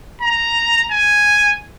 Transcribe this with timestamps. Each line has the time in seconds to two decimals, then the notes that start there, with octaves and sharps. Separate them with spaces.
0.22 A#5
0.91 G#5